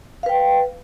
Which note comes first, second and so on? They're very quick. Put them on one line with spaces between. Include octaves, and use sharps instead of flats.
F5 B4 G5